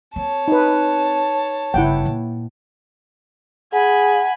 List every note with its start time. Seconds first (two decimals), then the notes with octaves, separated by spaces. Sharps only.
0.16 C4 C#5 A5
0.48 D#4 B4
1.74 G1 C#3 E4 F#5 G5
2.06 A#2
3.73 G#4 F#5 G#5 B5